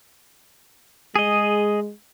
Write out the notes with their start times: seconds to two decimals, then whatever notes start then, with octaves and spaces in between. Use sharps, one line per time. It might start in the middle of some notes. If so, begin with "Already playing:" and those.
1.16 G#3 G#4 D#5